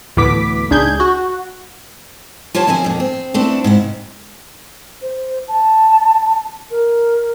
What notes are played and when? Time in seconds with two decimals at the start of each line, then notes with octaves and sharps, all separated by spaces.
0.17 D2 A2 E3 B3 D6 B6
0.71 C#2 D4 D#4 G#4 G6 G#6
1.00 F#4
2.55 F4 G4 C#5 F5 A5
2.67 B2 F3 C4 C5 G#5
2.84 F2 A#2
3.00 C4
3.34 A3 B3 C4 D4 E4
3.64 G#2 C3 E4
5.02 C5
5.48 A5
6.71 A#4